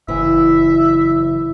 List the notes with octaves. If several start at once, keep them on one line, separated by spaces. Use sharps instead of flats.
F#1 E3 E5